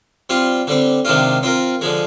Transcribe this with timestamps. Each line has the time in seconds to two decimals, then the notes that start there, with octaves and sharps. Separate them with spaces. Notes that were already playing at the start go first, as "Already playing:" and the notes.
0.30 G3 C4 F4
0.67 D3 G3 C4
1.05 C3 D#3 G#3 D4 F4
1.43 C4 F4 A#4
1.81 D3 F3 G#3